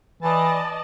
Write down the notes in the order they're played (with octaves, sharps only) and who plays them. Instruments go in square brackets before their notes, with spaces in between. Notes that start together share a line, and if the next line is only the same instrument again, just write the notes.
[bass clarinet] E3 [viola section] D5 D#5 A5